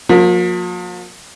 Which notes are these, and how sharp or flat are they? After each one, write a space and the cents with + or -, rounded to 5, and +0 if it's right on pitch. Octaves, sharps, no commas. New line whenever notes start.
F3 +45 A#3 +0